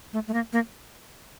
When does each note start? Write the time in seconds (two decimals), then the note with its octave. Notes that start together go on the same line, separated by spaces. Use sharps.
0.13 A3
0.28 A3
0.34 A#3
0.53 A#3